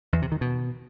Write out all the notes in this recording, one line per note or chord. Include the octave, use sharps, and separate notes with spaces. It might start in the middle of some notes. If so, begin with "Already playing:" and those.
E2
C3
D#3
B2